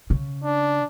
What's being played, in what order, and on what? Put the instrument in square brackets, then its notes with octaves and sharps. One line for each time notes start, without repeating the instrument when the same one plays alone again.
[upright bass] C#3
[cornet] D4